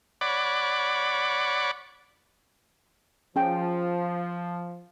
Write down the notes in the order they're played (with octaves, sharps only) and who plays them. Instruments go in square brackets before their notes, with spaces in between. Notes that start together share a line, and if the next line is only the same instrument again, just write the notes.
[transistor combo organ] C#5 D5 F#5 B5 D6
[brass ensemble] F3 [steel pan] C#4 G#4 G5